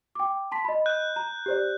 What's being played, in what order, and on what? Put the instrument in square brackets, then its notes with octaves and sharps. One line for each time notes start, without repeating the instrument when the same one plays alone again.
[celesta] G5 D6
A5 C6 B6
D#5 B5
[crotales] F#6 G6
[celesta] A#5
G4 C5 D5